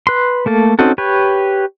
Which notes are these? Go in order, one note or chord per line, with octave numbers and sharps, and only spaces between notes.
B4 C6
A3 A#3 A4
C4 C#4 D#4 F#4 A4
G4 B4 C#5